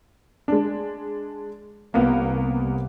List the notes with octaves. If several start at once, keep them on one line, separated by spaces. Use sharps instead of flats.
G#3 D4
C2 A#3 B3